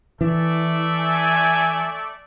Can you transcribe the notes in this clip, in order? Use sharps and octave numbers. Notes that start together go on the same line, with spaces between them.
E3 A3 D5 E5
G#5